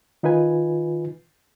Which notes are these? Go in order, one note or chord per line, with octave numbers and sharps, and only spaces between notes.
D#3 D#4 F4 B4 G#5